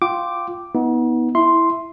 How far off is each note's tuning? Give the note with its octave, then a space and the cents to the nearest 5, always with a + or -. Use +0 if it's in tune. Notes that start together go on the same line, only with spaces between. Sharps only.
F4 +0 G5 -20 D6 +0
B3 -10 D#4 +40
E4 +0 E5 +0 C6 +0